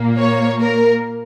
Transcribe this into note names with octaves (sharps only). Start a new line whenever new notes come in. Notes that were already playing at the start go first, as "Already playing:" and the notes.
Already playing: A#2 A#3
C#5
A#4